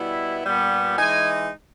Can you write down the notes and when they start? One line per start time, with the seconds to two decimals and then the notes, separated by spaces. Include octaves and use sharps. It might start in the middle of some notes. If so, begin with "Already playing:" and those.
Already playing: B2 G3 B3 E4
0.45 A#2 G3 B3
0.97 E3 G#3 D#4 G#5